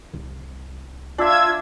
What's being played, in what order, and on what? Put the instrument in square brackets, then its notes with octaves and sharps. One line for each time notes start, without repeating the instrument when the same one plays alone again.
[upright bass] C2
[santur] D4 E5 [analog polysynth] F4 E6 G#6